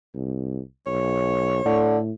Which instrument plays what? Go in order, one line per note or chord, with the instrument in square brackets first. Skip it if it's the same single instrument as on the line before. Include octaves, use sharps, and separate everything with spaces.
[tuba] C2
[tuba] B1 [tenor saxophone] C#5
[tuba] A2 [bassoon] D3